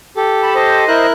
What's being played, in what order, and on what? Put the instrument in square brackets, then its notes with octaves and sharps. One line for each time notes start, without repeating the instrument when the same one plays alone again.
[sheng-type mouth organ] G4 A4
[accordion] A5 B5
C5 D#5
[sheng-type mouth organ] E4 A#4 F#6